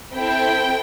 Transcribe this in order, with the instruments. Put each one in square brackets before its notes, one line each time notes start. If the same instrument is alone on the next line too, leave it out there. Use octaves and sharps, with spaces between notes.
[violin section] C4 E4 A4 G5